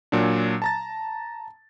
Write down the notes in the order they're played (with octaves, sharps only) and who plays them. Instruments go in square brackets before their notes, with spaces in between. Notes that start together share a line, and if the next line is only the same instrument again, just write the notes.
[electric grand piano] A#2 F#3 D4
A5 A#5 A6